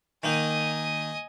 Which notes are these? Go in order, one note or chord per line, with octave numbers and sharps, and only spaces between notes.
D#3 A#3 D#4 D#5 G#5